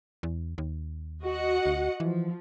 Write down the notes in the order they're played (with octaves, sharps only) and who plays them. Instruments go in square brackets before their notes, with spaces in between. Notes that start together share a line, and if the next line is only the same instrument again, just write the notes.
[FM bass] E2
D#2
[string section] F#4 D#5 F#5
[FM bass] D2
[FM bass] E3 [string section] F3